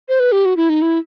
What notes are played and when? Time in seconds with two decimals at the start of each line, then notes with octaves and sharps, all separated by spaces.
0.09 C5
0.20 B4
0.32 G4
0.45 F#4
0.57 E4
0.69 D#4
0.82 E4